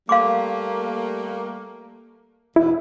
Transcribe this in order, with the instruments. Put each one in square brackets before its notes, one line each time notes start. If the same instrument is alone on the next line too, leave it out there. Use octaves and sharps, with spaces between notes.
[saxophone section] G3 A3 A#3 [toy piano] F5 C6 D6
[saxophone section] E2 B2 [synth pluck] E4